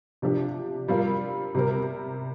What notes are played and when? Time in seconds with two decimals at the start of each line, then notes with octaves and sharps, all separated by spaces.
0.22 C3 F3 D4 G4
0.88 G3 C4 F4 A#4
1.55 C3 G3 C4 A#4